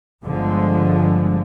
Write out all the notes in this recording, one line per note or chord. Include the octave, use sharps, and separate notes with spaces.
G1 D3 F3 G#3